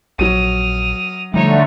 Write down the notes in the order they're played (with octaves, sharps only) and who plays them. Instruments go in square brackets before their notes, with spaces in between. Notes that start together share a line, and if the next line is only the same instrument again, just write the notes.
[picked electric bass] A#1 [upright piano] F#3 D#7 [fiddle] D#6 F6
[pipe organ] D3 A3 [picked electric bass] F3 G3 [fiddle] D#4 C#5